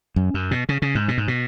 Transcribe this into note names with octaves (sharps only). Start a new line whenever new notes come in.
F#2
F#2
B2
C#3
C#3
G#2
B2
G#2
B2